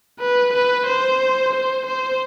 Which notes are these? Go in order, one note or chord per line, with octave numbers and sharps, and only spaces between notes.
B4
B4
C5
C5
C5